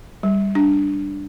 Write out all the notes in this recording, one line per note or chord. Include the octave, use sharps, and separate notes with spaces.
G3
D4